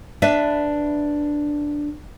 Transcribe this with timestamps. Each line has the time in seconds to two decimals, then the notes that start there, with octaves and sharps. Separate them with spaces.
0.22 D4 B4 D5 E5